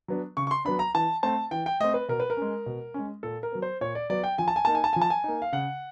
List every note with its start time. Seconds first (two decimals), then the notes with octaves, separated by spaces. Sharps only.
0.08 F#3 B3 D4
0.37 C#3 C#6
0.47 C#6
0.51 C6
0.65 F#3 B3 D4 B5
0.79 A#5
0.95 E3 A5
1.23 A3 C4 A5
1.51 E3 G5
1.66 G5
1.80 A3 C4 D#5
1.94 B4
2.09 B2 A#4
2.20 B4
2.30 A#4
2.37 G#3 C#4
2.66 B2
2.94 G#3 C#4
3.23 A#2 A4
3.43 A#4
3.52 F#3 B3
3.62 C5
3.81 A#2 C#5
3.95 D5
4.10 F#3 B3 D5
4.24 G5
4.38 F3 G#5
4.48 A5
4.56 G#5
4.65 A#3 D#4 A5
4.75 G#5
4.84 A5
4.93 F3 G#5
5.01 A5
5.10 G#5
5.24 A#3 D#4
5.42 F5
5.52 C#3 F#5